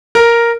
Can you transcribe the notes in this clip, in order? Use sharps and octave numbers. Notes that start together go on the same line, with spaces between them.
A#4